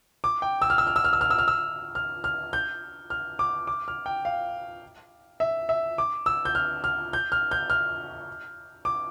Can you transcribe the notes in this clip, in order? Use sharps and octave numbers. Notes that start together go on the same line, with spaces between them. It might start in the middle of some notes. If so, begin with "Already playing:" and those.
D6
G5
E6
F6
E6
F6
E6
F6
E6
F6
E6
F6
E6
F6
F6
G6
F6
D6
D6
F6
G5
F5
E5
E5
D6
E6
G6
F6
F6
G6
F6
G6
F6
D6